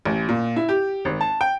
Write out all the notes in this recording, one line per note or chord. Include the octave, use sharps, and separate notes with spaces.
A1
A#2
E4
G4
G#1
A5
G5